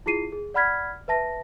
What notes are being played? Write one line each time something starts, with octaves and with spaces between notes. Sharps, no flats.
E4 F4 G#4 C7 D#7
G#4
D5 F#5 B5 F6 G#6 B6
B4 E5 A5 A#6